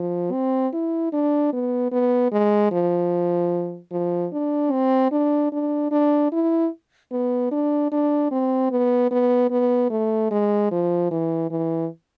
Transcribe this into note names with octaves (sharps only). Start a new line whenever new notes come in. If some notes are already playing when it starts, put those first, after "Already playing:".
Already playing: F3
C4
E4
D4
B3
B3
G#3
F3
F3
D4
C4
D4
D4
D4
E4
B3
D4
D4
C4
B3
B3
B3
A3
G#3
F3
E3
E3